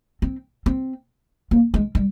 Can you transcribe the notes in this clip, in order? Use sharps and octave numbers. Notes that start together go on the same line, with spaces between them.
C4
C4
A#3
G#3
G3